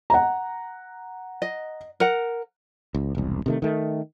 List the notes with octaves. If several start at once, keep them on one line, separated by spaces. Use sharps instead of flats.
F#5 A#5
D#5
A#4 F#5
C#2
E1 C2
C3 D#3 A3
D#3 A3